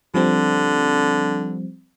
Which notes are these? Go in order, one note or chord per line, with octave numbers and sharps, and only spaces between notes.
D3 F3 G3 C4